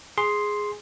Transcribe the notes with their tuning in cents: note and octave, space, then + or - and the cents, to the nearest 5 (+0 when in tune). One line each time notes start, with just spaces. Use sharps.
G#4 +0 C6 +0